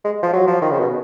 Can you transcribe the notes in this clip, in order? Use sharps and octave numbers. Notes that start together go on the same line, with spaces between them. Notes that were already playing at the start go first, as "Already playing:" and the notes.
G#3
F3
F#3
F3
D#3
C#3
B2